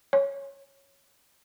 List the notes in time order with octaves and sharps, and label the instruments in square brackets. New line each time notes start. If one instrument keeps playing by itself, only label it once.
[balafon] C#5